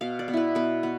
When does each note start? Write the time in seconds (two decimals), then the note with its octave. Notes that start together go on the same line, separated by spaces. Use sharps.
0.01 B2 F5
0.19 D5
0.28 B3
0.33 E4 B4
0.55 B2 B4
0.83 B3